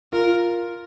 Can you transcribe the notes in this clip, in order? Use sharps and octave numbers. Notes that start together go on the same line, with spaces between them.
F4 A#4